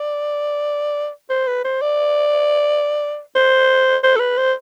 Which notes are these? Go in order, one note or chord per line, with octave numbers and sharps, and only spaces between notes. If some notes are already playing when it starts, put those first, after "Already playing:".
Already playing: D5
C5
B4
C5
D5
C5
C5
A4
B4
C5